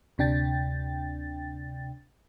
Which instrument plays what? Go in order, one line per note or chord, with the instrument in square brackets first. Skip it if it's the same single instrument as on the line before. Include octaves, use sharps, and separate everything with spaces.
[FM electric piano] D2 C3 D4 G5 A6